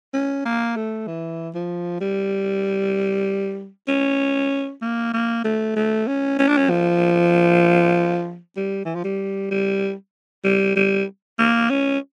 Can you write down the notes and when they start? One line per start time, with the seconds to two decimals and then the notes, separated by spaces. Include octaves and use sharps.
0.13 C#4
0.45 A#3
0.76 A3
1.07 E3
1.54 F3
2.00 G3
3.88 C#4
4.81 A#3
5.13 A#3
5.44 A3
5.76 A3
6.07 C#4
6.39 C#4
6.48 D4
6.57 C#4
6.69 F3
8.57 G3
8.85 E3
8.95 F3
9.04 G3
9.51 G3
10.44 G3
10.76 G3
11.39 A#3
11.70 C#4